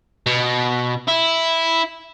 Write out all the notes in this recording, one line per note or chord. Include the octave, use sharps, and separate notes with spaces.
B2
E4